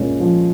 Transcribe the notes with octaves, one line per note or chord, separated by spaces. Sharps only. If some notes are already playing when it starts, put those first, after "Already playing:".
Already playing: A#2 G#3 C#4
F3